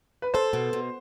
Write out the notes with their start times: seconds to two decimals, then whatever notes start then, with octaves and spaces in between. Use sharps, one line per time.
0.22 B4
0.34 A4 C5
0.53 B2
0.73 B2